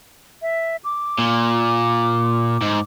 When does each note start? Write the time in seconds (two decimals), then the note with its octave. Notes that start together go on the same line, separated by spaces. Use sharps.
0.42 E5
0.84 D6
1.18 A#2
2.62 G#2